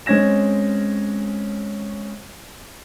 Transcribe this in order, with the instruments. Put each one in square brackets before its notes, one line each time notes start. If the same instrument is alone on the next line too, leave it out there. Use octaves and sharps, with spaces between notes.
[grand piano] G#3 C4 C#4 G#6 A#6 E7